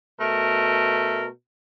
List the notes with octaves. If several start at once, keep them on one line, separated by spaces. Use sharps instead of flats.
B2 A3 A#4